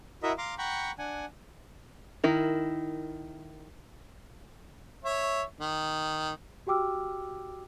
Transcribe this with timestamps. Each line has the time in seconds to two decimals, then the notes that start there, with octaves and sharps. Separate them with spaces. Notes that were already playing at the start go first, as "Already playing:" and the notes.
0.23 E4 F#4 A#4 D#5 E5
0.38 F5 A#5 C6 D6
0.58 F#5 G5 A#5 B5 C#6
0.98 D4 F#5 G#5
2.24 D#3 E4 A#4
5.05 C#5 E5
5.60 D#3
6.67 F#4 G4 G5 D6 E6 F6